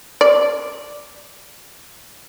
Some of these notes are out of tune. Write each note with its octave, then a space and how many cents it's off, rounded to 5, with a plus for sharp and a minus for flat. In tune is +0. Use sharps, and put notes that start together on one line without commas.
D5 +5